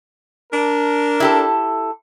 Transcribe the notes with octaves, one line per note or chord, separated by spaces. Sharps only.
D4 A#4
E4 G4 A4